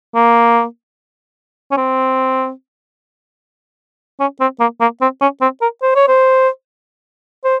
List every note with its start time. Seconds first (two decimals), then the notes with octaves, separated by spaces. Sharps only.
0.15 A#3
1.71 C#4
1.77 C4
4.20 C#4
4.41 C4
4.60 A#3
4.81 A#3
5.01 C4
5.21 C#4
5.41 C4
5.61 A#4
5.82 C5
5.96 C#5
6.08 C5
7.44 C5